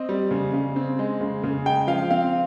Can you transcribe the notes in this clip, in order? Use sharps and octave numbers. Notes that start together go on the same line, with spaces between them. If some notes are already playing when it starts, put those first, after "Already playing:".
Already playing: C4 D#5
G3
C#3
C#3
C4
G#3
C#3
C#3
G#3 G5
F3 F5
C4 F5